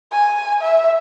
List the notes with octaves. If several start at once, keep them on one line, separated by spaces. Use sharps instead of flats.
G#5
E5